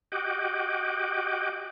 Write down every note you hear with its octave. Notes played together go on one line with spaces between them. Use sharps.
F#4 G4 D#5 F#5 G5 D6